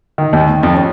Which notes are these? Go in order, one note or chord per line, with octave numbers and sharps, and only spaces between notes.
D#3
D#2
D#3
F2
C#4